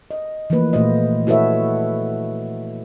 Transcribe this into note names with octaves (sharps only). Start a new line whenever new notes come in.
D#5
E3 F3 A3 A#3 B4
A#2 A3 F#4 C5 D#5
E4 F#4 A4 B4 C#5 E5